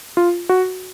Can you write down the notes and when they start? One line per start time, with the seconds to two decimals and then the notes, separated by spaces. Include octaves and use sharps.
0.17 F4
0.49 F#4